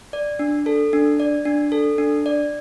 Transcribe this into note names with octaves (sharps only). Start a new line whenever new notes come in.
D5
D4
A4
D4
D5
D4
A4
D4
D5